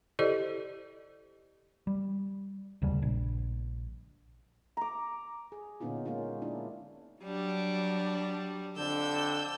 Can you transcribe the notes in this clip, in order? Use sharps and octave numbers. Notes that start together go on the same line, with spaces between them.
E4 G4 A4 C5 D5 D#5
G3
F1 D#2 C#3 G3
A#1
A#5 D6
G#4
A#2 D3 B3 C#4 D#4 F4
G#3 A#3 C#4 D#4 F4
D4 E4
F#3 G3 D4
F2 D3 D4 E6 G6